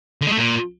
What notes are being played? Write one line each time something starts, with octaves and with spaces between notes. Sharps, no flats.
D3
G#3
A3
A#2